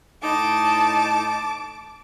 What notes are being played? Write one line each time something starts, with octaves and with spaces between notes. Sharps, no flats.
A2 D#4 A5 D6